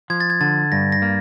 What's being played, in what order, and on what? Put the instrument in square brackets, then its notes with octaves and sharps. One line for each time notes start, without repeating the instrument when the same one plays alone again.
[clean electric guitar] F3 [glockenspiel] G#6
[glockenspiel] A6
G#6
[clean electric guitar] D3 [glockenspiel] A6
[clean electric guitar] G2 [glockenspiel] A#6
[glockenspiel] A#6
[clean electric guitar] A#3